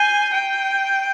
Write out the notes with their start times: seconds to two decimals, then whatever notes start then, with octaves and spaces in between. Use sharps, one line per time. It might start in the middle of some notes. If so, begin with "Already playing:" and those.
Already playing: G#5 G6 C7 D#7 G7
0.34 G5